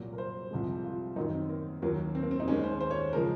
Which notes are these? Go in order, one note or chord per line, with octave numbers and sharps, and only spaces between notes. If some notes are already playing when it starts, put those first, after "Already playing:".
Already playing: C2 A#2 F#3
A#4
C5
C2 C3 F3 G#3
F4
F#2 D#3 F#3 D#4
C4
A#3
D#2 D#3 F#3 A#3
C4
A#3
C4
D#4
D#2 D#3 G#3 C#4
C5
C5
C#5
C#3 F3 G#3 A#4